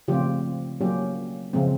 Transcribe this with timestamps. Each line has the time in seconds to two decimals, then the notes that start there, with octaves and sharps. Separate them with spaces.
0.08 C#3 F3 A3 C4 F4 G4
0.81 F#3 A#3 C#4 F4 G4
1.53 C#3 F3 G#3 C4